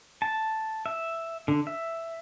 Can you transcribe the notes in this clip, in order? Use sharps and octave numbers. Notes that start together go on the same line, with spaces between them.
A5
E5
D3
E5